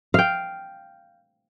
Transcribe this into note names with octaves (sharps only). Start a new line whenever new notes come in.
F5 G5